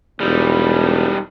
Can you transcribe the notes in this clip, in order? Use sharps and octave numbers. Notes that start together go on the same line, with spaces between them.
E1 G3 D#4